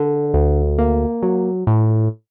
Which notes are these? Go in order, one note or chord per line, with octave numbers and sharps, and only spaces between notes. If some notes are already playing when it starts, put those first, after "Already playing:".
Already playing: D3
D2
A#3
F#3
A2